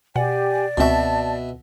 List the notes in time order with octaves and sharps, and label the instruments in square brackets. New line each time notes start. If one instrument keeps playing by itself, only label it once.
[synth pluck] B2 F#5 [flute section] G4 G#5 [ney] D5
[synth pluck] C#2 C4 F#4 [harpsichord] B2 E5 [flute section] A5